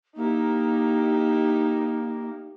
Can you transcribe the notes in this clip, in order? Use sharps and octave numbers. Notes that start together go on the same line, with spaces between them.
A#3 D#4 E4 G4